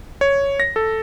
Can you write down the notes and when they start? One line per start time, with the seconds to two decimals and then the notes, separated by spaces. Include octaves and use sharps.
0.21 C#5
0.60 A#6
0.76 A4